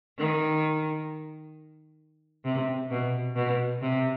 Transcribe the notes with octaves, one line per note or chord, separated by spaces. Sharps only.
D#3
C3
B2
B2
C3